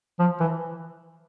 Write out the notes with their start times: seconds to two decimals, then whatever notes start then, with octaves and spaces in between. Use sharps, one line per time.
0.19 F3
0.40 E3